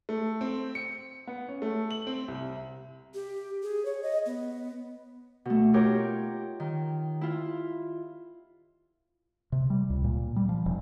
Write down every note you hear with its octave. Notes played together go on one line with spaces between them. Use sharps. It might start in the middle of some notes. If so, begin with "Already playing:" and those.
A3
C4
C#7
B3
C#4
A3
F#7
C4
C2
G4
G#4
C#5
D#5
B3
B2 A3
D#4 F4 G4 A#4 C#5
D#3
E4 F4
C3
G3
C#2
A#2
G3
F3
E1